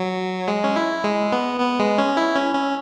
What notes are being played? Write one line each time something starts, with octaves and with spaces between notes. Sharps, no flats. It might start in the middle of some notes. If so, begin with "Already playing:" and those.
Already playing: F#3
G#3
C#4
E4
G#3
B3
B3
G#3
C#4
E4
C#4
C#4